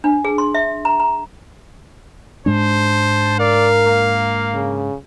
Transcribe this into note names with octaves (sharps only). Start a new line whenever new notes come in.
D4
G#4
C6
E5
A#5
A#5
G#2 G#3 D4 C5 A5
A#4 D5 F5
A#3
C#3